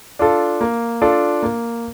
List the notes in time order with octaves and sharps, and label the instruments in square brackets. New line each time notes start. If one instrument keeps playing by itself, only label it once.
[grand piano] D4 F4 A4
A#3
D4 F4 A4
A#3